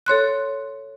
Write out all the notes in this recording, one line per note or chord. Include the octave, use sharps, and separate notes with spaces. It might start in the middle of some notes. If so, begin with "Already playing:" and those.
A4 C#5 C6 F#6